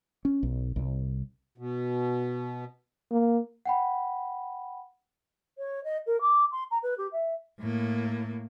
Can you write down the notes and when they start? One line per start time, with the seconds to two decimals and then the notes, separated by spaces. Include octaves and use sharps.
0.25 C#4
0.43 B1
0.76 C2
1.58 B2
3.11 A#3
3.66 F#5 G5 B5
5.58 C#5
5.84 D#5
6.06 A#4
6.21 D6
6.52 C6
6.71 A#5
6.83 B4
6.98 G4
7.12 E5
7.60 A2 A#3